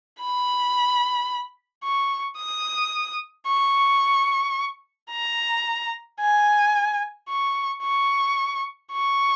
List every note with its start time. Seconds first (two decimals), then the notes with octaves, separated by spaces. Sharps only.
0.21 B5
1.84 C#6
2.38 D#6
3.48 C#6
5.11 A#5
6.20 G#5
7.29 C#6
7.83 C#6
8.93 C#6